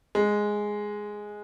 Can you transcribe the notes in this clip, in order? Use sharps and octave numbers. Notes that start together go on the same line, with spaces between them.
G#3